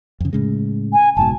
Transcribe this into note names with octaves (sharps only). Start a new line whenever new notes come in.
F2 C#3
A2 C#3 G#3
G#5
F#1 G#2 B2 A5